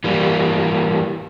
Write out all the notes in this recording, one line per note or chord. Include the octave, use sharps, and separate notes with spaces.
E3 G3 A#3